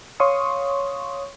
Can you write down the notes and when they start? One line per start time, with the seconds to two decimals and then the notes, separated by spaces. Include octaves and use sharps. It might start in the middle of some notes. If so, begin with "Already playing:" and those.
0.20 C#5 F5 C6 C#6 D#6